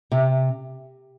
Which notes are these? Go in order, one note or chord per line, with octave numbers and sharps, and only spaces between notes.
C3